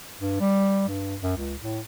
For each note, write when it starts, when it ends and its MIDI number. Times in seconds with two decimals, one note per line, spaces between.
0.19 0.37 43
0.40 0.86 55
0.88 1.16 43
1.22 1.32 42
1.36 1.55 37
1.60 1.79 45